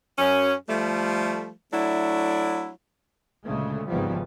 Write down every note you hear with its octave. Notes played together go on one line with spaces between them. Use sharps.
F#2 C#4
F3 G3 A3
F#3 A3 D4 E4
D2 A#2 C#3 G#3 A3
G#1 E2 C#3 F3 G3 B3